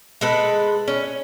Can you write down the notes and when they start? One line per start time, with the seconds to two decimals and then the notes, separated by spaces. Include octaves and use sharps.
0.21 G#3 A4 B4
0.88 C#4